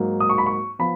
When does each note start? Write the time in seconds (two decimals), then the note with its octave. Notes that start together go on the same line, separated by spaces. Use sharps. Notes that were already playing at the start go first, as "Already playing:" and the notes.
Already playing: G#2 F#3 A#3 D#4
0.20 D#6
0.30 C#6
0.38 B5
0.46 C#6
0.79 F3 B3 B5